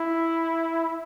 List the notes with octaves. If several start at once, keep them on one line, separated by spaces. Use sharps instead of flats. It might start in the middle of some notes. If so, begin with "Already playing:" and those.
Already playing: E4